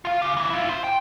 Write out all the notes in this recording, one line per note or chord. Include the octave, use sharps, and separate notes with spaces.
F4 F5
C#3 G4
D#2 E3
E4 F4
C5
G5